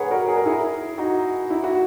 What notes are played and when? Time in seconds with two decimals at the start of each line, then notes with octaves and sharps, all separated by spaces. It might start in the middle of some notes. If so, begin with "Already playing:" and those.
Already playing: G#4 A#4 B4 C#5 F#5 A#5
0.10 F#4 A#4
0.28 G#4
0.37 A#4
0.46 E4 G#4
0.98 D#4 F#4
1.50 E4
1.64 F#4